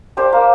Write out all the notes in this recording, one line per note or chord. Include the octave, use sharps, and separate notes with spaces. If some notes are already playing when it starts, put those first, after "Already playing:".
D4 G4 C5
A#3